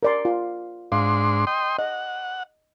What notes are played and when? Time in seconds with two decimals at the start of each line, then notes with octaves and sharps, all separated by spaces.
0.03 A#4 D5 C6
0.25 F4
0.92 G#2 D4 F5 C6
1.47 D#5 G5 C6
1.78 D#5 F#5